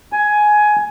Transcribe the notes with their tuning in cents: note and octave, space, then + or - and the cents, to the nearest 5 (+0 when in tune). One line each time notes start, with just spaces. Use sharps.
G#5 +15